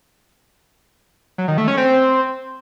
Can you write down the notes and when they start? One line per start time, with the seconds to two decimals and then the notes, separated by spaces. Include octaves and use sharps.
1.38 F#3
1.48 D#3
1.58 A3
1.68 C#4
1.77 C4